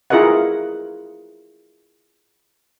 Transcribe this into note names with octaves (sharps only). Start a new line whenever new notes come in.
E4 F4 G#4 A#4 D#5 F#5